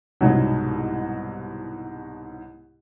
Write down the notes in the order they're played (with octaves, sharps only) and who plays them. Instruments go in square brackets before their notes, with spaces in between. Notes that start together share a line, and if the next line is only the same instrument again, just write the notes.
[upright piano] C2 G#2 B2 F#3